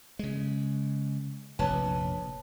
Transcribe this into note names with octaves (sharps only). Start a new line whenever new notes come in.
C#3 G#3
F1 A#1 B4 C#5 A5